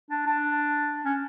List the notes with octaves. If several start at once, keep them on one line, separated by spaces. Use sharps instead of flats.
D4
D4
C#4